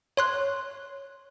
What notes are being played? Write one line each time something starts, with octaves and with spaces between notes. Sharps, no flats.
C#5 C6 F#6